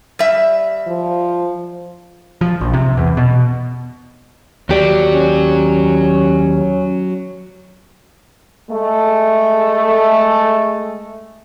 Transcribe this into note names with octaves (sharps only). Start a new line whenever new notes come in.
G3 E5
F3
F3
A#1
C3
E2
B2
D#2 F#3 G4 D5
C#4
G#3 A3